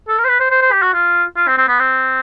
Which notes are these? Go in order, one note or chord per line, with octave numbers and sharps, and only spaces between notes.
A4
A#4
C5
B4
C5
C5
C5
G4
F#4
F4
F4
C4
C4
B3
C4